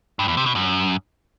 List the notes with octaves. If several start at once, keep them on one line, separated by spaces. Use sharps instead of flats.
G2
E2
C3
B2
F#2